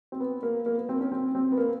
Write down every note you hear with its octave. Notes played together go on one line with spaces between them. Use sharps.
C4
B3
A#3
A#3
B3
C4
C#4
C4
C4
B3
A#3